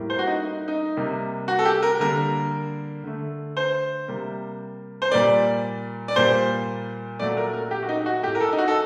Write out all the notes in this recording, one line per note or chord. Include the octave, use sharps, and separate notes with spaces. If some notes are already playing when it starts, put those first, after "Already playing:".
Already playing: A2 G3 A#3
C5
F#4
D#4
D#4
D#4
C3 G3 A#3
F#4
A4
G4
A#4
D3 G3 A#3 A#4
D3 A3
C5
C3 G3 A#3
C5
A#2 G3 A#3 D5
D5
A#2 G3 A#3 C5
A#2 F#3 A3 D5
A#4
A#4
G4
F#4
D#4
F#4
A2 A3 G4
A#4
A4
D#4
F#4
A4